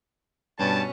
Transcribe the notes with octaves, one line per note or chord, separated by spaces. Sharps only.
G2 B2 C#4 A5